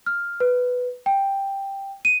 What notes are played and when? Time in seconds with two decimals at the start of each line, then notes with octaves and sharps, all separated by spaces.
0.06 F6
0.40 B4
1.06 G5
2.05 D#7